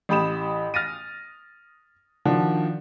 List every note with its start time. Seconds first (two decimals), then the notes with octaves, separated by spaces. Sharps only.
0.09 A1 G4 B5 D#6 E7
0.74 F6 A6 A#6 D#7
2.25 D#3 F3 D4 F#4